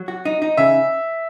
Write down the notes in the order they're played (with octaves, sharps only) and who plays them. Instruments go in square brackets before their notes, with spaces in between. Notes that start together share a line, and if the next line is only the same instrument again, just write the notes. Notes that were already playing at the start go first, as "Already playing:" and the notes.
Already playing: [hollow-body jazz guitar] F#3
F#4
D#4
D#4
[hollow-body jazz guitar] C#3 [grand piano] E5